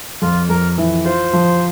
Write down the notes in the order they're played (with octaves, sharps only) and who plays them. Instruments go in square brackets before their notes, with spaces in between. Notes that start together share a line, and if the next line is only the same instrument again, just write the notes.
[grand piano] F2 [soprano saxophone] F4
[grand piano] F2 [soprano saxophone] A#4
[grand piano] E3
[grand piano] F4 [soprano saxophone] C5
[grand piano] F3